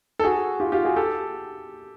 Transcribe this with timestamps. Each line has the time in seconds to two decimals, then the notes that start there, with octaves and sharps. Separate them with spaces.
0.19 A4
0.24 F#4 G#4
0.60 F4 G4
0.72 F4 G4
0.85 F#4 G#4
0.96 G4 A4